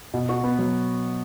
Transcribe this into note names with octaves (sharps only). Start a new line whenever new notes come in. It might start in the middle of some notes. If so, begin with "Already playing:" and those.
B2
F#4
B3
F#3